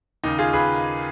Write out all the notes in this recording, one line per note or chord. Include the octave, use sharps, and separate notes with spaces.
D#2 C#3 D#4
F4 G#4
G#4 B4